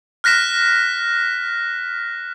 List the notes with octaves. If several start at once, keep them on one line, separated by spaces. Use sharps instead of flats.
F6 F#6 A#6 B6 E7